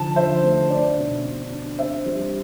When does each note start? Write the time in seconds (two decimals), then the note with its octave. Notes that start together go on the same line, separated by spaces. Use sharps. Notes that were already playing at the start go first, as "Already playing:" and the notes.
Already playing: D3 F3 A5
0.16 F3 C5 E5
0.43 A3
0.70 D4 D5
0.97 B2
1.25 D4
1.51 D4
1.78 C4 C5 E5
2.06 G3